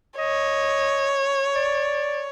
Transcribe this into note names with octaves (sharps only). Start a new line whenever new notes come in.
C#5 D#5
D5